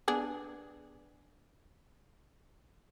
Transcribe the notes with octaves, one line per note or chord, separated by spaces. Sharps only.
B3 D4 G#4